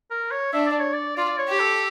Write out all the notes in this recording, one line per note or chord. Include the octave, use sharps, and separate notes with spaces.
A#4
C#5
D4 E5
D5
C#5
D5
F4 D5
C#5
G4
A4